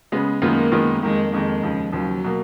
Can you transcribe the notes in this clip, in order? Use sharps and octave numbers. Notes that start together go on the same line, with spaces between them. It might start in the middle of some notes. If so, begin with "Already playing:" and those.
C#3 G#3 B3
F#2 D#3 G#3 A#3 B3 F4
F#2 D#3 G#3 B3 F4
F2 D#3 G#3 A#3
F2 D#3 G#3 A#3
D#2 C#3 F3
D#2 C#3 F3 F#3
B2 A#3